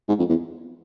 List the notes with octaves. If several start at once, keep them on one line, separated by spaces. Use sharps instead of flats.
G#2
F2
E2